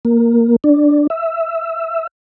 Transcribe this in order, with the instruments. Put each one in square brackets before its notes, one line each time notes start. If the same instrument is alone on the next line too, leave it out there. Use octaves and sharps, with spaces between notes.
[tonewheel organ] A#3
D4
E5